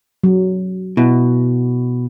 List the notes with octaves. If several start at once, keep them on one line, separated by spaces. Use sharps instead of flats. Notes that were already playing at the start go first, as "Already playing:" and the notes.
F#3
B2 E4